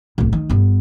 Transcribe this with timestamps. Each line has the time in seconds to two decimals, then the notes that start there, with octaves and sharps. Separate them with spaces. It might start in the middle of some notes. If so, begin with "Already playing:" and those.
0.18 D1 C2
0.33 D#3
0.50 G1 B3